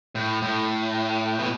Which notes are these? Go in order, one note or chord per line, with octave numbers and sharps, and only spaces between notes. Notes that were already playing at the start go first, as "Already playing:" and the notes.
A2
A2
B2